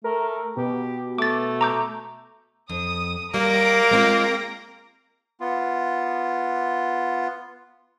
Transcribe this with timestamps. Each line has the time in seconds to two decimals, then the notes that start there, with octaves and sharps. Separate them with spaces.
0.04 A3 A#4
0.57 B2 G4
1.18 A3 D6 A6
1.61 A#5 D6 G6
2.70 F2 D#6
3.34 G3 A#3 A#5 A#6 D7
3.91 G#3 C4 F4
5.40 B3 F4